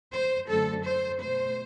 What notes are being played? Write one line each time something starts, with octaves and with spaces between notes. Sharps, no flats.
C5
F#2 D3 F#3 A3 A4
C5
B2 A3 C5